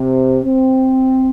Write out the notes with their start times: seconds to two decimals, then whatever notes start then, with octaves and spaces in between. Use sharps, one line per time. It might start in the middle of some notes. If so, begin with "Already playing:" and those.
Already playing: C3
0.44 C4